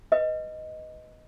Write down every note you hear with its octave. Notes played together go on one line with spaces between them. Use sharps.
B4 D#5